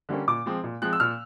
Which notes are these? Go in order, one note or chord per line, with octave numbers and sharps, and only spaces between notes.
D3 G3 A#3 C#4
A#2 D6
F3 G#3 C4
A#2
F3 G#3 C4 F#6
E6
A#2 F6